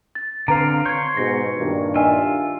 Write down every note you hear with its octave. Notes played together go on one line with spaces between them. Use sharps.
A6
D3 C4 B4 F5 A#5
C#5 C6 G6 G#6
G#2 B2 A#6
G2 A#2 D#3
D4 F4 D#5 E5 G#5